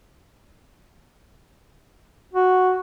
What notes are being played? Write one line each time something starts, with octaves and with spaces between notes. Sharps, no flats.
F#4